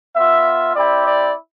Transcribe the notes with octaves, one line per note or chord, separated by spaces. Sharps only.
B3 F4 E5
C4 E4 G4 D5
D5